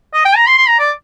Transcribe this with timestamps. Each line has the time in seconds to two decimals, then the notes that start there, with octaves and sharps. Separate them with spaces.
0.14 D#5
0.25 G5
0.36 A#5
0.47 C6
0.57 C6
0.68 A#5
0.79 D5